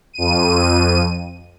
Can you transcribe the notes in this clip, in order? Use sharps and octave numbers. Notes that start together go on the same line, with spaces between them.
F2 D#7